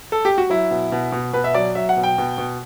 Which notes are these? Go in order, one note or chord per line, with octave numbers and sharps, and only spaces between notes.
A4
G4
F#4
F#3 E4
B2
B2
B2
B2 B4
E5
F#3 D5
F#3 E5
F#5
B2
G5
B2
B2